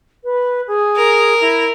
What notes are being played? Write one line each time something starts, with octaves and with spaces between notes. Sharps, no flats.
B4
G#4
A#4
E4